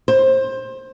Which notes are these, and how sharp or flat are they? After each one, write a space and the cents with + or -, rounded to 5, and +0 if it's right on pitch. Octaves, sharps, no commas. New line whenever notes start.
C5 +20